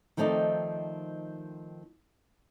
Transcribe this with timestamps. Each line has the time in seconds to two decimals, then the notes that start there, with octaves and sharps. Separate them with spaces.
0.17 D#3 F3 A3 C4 D#4 D5